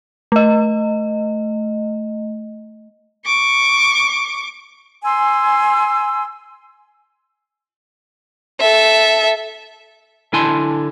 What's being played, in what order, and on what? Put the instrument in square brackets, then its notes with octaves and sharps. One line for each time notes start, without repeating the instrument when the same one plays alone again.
[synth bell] A3 D#5
[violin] C#6 D6
[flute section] G#5 C6 E6
[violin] A4 E5
[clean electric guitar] D3 E4 G#5 A5 C6